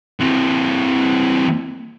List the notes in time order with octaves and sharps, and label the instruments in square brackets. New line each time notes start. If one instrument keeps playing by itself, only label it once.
[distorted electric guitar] E3 C4